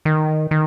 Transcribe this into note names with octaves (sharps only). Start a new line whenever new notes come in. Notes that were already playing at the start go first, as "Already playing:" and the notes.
D#3
D#3